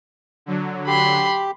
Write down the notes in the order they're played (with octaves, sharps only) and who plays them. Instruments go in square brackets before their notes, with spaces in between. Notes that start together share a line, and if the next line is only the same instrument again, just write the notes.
[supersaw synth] D3 F#3
[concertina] G4 [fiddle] B5 C6